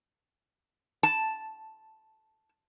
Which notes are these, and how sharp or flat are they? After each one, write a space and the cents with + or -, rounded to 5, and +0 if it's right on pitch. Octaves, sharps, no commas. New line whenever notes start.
A5 -5